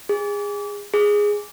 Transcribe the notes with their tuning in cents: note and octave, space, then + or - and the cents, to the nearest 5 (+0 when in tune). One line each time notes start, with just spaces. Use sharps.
G#4 -25
G#4 -5